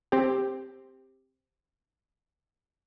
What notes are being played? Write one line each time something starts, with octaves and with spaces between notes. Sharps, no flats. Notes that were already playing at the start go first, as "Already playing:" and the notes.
C4 G4